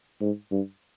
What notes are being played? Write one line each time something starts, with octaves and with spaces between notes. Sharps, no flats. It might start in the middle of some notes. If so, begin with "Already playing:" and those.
G#2
G2